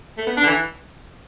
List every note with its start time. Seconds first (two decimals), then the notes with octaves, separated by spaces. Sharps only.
0.18 A3
0.27 B3
0.37 D4
0.43 D3
0.47 E3